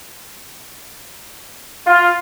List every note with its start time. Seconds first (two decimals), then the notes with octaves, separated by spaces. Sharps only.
1.86 F4